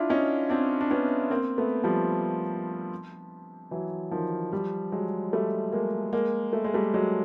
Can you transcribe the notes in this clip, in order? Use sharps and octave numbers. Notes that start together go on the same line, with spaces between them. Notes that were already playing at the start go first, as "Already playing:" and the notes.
Already playing: D4 E4 F4
C#4 D#4
C4 D4
D4
B3 C#4
A#3 C4
A3 B3
F3 G3
E3 F#3
D#3 F3
F3 G3
F#3 G#3
G3 A3
G#3 A#3
G#3 A#3
A3
G#3
G3 A3
F#3 G#3